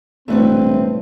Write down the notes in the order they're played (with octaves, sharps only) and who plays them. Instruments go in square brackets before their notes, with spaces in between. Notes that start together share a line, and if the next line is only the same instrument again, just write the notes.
[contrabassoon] E1 [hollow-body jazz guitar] C2 A2 [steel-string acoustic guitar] A3 B4 C#5 [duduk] C4